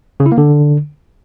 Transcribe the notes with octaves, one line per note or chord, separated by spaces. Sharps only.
C#3
E4
A#3
D3